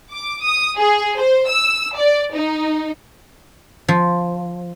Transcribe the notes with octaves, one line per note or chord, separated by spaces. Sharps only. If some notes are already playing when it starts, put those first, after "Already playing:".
D6
D#6
G#4
C5
E6
D5
D#4
F3